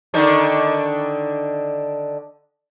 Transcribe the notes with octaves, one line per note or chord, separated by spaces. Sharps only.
D3 D#3 D4